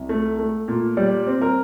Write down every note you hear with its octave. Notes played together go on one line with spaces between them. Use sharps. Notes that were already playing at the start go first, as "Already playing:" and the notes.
Already playing: C2
A3
A3
A#2
G3 D5
C4
A#4